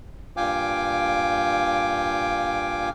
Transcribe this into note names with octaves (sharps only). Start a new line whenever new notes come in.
G2 A#2 F5 G5 G#5 D6